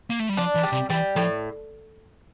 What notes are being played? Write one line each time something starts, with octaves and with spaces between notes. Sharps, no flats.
A#3
A3
G3
F3 D4
E3
G3
C3
E3 G3
A2 F3